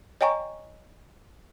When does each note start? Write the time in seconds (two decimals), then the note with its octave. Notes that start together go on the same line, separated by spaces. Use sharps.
0.21 C#5 D#5 G5 G#5 A#5 C#6